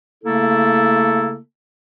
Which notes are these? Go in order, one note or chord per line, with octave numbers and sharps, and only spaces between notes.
C#3 A3 A#3 E4 A4